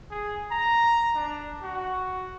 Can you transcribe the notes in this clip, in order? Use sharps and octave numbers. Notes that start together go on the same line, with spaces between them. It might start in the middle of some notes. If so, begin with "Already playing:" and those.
G#4
A#5
D4
F#4